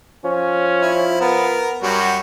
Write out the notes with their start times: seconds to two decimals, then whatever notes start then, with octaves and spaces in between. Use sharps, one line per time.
0.24 F3 C#4
0.82 E4
1.20 B3 A#4
1.83 F#2 G3 F#4